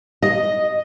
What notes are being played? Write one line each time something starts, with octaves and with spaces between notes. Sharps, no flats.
D#5